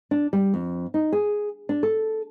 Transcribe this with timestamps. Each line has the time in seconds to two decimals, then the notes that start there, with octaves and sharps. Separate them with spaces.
0.11 D4
0.33 G3
0.54 F2
0.94 D#4
1.12 G#4
1.69 D4
1.83 A4